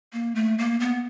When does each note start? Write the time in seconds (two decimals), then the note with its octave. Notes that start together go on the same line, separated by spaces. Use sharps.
0.13 A#3
0.35 A3
0.58 A#3
0.80 B3